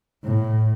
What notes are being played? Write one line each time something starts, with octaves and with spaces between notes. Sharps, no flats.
A2